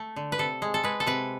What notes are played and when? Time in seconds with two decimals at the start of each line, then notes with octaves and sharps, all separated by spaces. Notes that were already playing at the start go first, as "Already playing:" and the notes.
Already playing: A3
0.16 D3
0.32 B4
0.38 C3 A4
0.62 G#3
0.74 A4
0.83 G#3 B4
1.00 A4
1.07 C3 B4